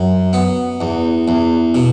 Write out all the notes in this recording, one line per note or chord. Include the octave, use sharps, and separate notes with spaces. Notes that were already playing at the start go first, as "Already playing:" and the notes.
Already playing: F#2
B3
E2
E2
B2